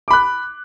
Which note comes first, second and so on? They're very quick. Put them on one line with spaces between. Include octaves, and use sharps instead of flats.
D6 B5 F#6